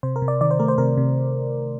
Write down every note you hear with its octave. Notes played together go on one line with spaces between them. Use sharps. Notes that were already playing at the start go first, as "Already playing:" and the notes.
C3 C5
A#4
C3
D5
D#3 D5
C5
A3 A#4
C5
C3 A#4
C3